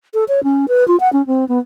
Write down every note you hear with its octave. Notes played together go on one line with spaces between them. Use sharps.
A4
C#5
C#4
B4
F4
F#5
C#4
C4
B3